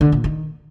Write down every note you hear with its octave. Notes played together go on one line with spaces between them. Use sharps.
D3
A#2
D#3